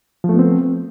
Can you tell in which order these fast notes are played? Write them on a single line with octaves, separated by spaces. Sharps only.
F3 A3 B3 C4